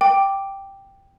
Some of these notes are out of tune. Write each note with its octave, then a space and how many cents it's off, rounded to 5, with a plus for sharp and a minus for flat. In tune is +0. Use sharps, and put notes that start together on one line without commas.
G5 +0 D6 +0